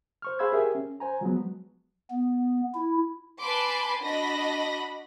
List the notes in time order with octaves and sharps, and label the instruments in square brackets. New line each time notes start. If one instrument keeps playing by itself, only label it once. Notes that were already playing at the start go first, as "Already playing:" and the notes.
[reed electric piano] C5 C#6 F6
G#4 C5 F5 B5 E6 G#6
G4 G#4 A#4 E5
C#4
C5 G#5 A#5
F3 F#3 G#3 B3
[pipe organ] B3
E4
[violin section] B4 G#5 A5 B5 C6 D6
D4 F#4 D#5 B5 A#6